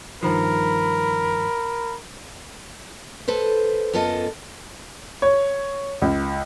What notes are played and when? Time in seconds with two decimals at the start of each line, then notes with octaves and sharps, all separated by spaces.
0.23 G2 D#3 F3 A#4 B5
3.28 A4 B4 C5
3.93 F#2 B3 F4 A4 D#5
5.22 C#5
6.02 C#2